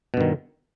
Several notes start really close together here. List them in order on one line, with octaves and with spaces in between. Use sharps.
B2 G2 D#3